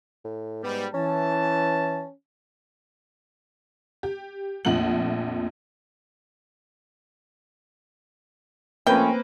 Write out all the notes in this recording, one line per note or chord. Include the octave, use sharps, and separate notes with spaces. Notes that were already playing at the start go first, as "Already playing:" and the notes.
A2
G#2 G3 B3
E3 C#4 A5
G4
A#1 F2 A#2 A3 F#5 F#7
F3 A3 A#3 C4 C#4 B4 G5